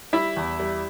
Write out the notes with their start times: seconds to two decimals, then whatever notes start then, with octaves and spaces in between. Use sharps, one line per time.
0.13 G3 E4 E5
0.37 E2
0.60 G3